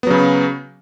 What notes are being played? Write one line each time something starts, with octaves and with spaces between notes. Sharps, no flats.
C#3 F#3 B3